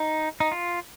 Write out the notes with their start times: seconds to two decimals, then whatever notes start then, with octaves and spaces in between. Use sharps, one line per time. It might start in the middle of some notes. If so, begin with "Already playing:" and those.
Already playing: D#4
0.40 D#4
0.52 F4